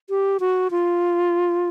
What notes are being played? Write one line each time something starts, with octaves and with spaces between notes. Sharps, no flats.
G4
F#4
F4